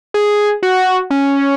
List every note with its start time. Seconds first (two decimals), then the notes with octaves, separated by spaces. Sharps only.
0.14 G#4
0.63 F#4
1.11 C#4